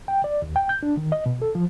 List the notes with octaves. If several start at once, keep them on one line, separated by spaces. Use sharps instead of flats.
G5
D5
D#2
G5
G6
D4
D#3
D#5
B2
A4
F3